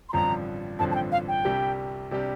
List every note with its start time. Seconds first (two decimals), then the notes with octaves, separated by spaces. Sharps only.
0.09 C6
0.13 A1 G2 D3 F3 C4 A#5
0.79 A1 G2 D3 F3 C4 A5
0.91 A5
0.95 G5
1.12 F5
1.28 G5
1.45 C2 C3 G3 D4 G4
2.11 C3 G3 D4 G4